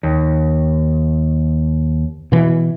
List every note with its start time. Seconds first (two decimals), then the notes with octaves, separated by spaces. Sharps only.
0.03 D#2
2.32 B2 E3